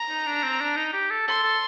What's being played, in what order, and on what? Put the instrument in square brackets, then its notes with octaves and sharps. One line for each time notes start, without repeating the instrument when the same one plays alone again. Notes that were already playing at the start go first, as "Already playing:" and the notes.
Already playing: [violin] A#5
[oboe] D#4
D4
C4
D4
D#4
G4
A4
[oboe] A4 [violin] C6
[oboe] A4